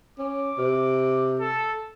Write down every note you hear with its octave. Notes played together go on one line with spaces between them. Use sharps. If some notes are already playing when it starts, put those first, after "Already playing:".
C#4 D6
C3
A4